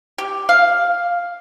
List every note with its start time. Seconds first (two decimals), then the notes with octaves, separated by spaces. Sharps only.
0.18 G4
0.49 F5